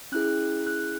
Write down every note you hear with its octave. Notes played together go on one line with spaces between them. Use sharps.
C#4 E4 G#4 F#6
F#6